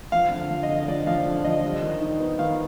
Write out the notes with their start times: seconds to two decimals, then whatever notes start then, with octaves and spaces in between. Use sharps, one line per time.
0.12 F3 F5
0.31 D3
0.50 F3
0.63 D#5
0.69 D3
0.88 F3 D5
1.07 F3 F5
1.26 D3
1.44 F3 D#5
1.63 G3
1.82 D#3
2.01 D#4
2.20 B3
2.39 D#3 F5